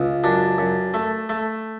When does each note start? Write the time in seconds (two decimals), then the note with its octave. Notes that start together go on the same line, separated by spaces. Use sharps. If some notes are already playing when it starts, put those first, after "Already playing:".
Already playing: C#2
0.24 F#2 D4
0.58 F#2
0.94 A3
1.29 A3